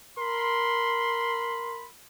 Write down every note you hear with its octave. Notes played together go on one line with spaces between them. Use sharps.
A#4 B5 C6